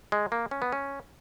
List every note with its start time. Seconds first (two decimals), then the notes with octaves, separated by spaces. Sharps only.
0.12 G#3
0.32 A#3
0.51 C#4
0.62 B3
0.72 C#4